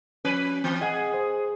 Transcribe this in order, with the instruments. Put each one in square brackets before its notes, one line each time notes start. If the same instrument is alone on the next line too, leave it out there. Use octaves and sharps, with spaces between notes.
[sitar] F3 B4 [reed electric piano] C#4
[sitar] E3 [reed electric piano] C4
[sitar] G#4 [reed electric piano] D#5 F#5 G#5
[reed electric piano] C5